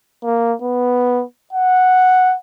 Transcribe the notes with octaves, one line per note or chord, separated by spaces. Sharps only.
A#3
B3
F#5